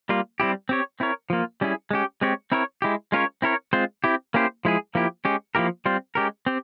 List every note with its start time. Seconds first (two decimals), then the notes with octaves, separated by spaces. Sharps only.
0.09 G3 A#3 F4
0.40 G3 C4 E4 G4
0.69 C4 G4 C#5
1.00 C4 E4 A#4 C#5
1.30 F3 A#3 F4
1.61 G3 C#4 E4 G#4
1.91 G#3 C#4 G4
2.21 G#3 C4 G4 C#5
2.52 C4 E4 A#4 C#5
2.82 G#3 E4 G4
3.12 G#3 C#4 F4 A#4 C#5
3.42 C4 E4 A#4 C#5
3.73 G#3 C4 F4 C5
4.04 C4 E4 G4
4.34 A#3 C#4 E4 G4 C5
4.65 F3 G#3 E4 G#4
4.95 F3 A#3 E4 G4
5.25 G#3 C#4 G4
5.55 F3 A#3 E4 G4 A#4
5.86 G3 C4 F4 C5
6.15 G#3 C#4 G4 A#4
6.46 C4 G4